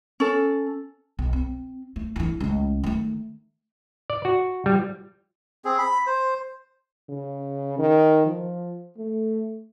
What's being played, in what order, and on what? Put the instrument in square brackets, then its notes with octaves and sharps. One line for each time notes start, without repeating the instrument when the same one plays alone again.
[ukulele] C#4 A4
[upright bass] B1
C4
A3
D3 E3
C#2 A3
D#3 A3
[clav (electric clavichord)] D5
F#4
G3
[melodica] C4 G#4
B5
C5
[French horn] C#3
D#3
F3
A3